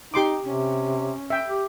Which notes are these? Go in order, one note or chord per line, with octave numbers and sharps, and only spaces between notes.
D#4 G4 C6 D6
C3 C#4
E5 G5
G4